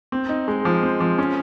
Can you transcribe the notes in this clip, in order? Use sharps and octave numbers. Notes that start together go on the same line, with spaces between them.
C4
D#4
G#3
F3
C4
F3
C#4